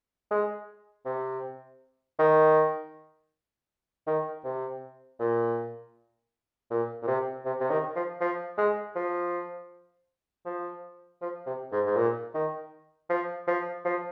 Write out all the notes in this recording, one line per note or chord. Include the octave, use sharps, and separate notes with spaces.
G#3
C3
D#3
D#3
C3
A#2
A#2
A#2
C3
C3
C3
D#3
F3
F3
G#3
F3
F3
F3
C3
G#2
G#2
A#2
D#3
F3
F3
F3